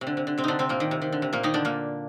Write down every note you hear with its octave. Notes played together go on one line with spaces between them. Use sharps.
C3
D3
C3
D3
C3 C4
D3 D4 D#4
C3 C4
A#2 A#3
D#3
C3
D#3
D3
C3
A#2 A#3
D#3 D#4
D3 D4
A#2 A#3